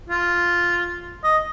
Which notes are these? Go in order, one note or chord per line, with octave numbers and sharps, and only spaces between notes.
F4
D#5